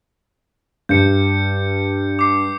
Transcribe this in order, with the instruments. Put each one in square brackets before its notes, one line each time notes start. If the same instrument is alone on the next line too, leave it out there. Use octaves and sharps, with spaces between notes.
[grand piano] G2 [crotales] G6 C#7
[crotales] D6 C7